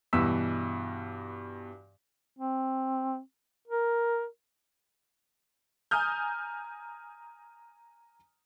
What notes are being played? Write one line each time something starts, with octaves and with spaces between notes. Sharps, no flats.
G2 B2 E3 E6 B6
C4
A#4
G#5 A#5 D#6 F6 G6